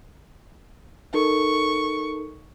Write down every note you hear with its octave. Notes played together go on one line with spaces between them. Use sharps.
D#4 A4 A#4 C#6